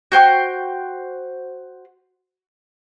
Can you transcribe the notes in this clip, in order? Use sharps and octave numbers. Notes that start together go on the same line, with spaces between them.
F#4 C5 G5 C#6